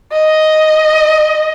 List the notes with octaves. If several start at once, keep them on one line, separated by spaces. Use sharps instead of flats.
D#5